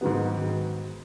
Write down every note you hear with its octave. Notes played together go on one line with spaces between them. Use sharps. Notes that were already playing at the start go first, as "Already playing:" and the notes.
G#2 D#3 F#3 B3